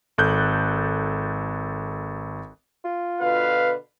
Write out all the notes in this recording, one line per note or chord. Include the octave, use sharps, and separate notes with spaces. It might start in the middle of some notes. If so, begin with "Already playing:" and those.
G#1 A4 F#6 G6
F4
B2 D3 B4 F5